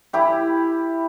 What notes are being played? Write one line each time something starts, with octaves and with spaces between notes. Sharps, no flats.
E4 G4 B5